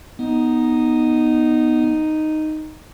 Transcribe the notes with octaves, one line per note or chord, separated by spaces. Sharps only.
B3 D#4